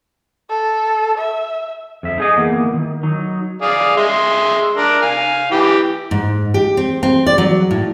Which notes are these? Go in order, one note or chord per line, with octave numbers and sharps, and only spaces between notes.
A4
E5
F2 E5
D#4 G#4 D#5
E3 A#3 B3
D#3
F#3 D#4
G#4 D5 F5
G#3 E5 C6
D4 A#4
F5 G#5
E3 G4
G#2
G4
C4
C4
D5
F#3
A2